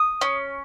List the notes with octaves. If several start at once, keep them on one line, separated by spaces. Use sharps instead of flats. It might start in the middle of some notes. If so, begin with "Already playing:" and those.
Already playing: D#6
C#4